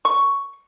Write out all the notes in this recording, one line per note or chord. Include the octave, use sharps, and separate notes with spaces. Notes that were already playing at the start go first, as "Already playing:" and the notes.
C#6